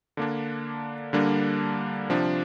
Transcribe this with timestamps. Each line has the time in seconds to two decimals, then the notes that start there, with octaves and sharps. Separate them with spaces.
0.17 D3 A#3 D4
1.13 D3 G3 A#3 D4
2.10 C3 F3 D4